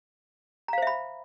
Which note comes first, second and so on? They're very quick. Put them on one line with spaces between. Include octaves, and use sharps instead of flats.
A#5 F5 C5 E5 B5